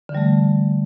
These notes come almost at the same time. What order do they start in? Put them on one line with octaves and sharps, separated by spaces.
D3 E3 G3 A3